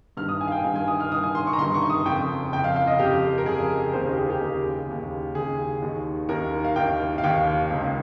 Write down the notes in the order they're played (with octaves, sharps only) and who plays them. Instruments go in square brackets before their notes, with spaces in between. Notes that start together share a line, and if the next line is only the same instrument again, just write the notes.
[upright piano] G2 F6
D#3
D#6
G#5
F5
G5
G2 D#3 G#5
G#5
D#6
F6
G2 D#3 D#6
G#5
C6
C#6
A#5
G2 C6
D#3
C#6
D#6
F2 C#3 G5
F2 G5
C#3
F5
F5
D#5
F2 C#3 G4
A#4
F2 C#3 G#4
D#2 C#3 C5
A#4
G4
G#4
G4
D#2 C#3 G#4
D#2 C#3
D#2 C#3 G#4
D#2 D#3
D#2 D#3 A#4
F5
D#2 D#3 G5
F5
D#2 D#3 G5
C#2 C#3